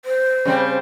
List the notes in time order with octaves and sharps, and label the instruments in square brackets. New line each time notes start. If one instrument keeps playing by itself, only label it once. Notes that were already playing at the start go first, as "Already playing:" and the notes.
[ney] C5
[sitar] C#3 G3 C4